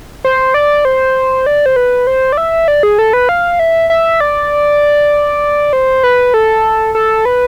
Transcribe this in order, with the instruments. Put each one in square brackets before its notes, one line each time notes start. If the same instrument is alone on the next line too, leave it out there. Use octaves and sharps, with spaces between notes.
[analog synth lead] C5
D5
C5
D5
C5
B4
C5
D5
E5
D5
G#4
A4
B4
F5
E5
E5
D5
C5
B4
A4
A4
B4